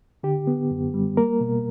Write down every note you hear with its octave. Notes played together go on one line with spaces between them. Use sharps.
D3 G4
B3
F#2
G3
A#3 A#4
B2